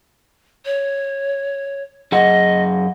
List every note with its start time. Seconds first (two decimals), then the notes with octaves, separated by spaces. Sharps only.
0.65 C#5
2.12 F#2 G#4 D#5 F#5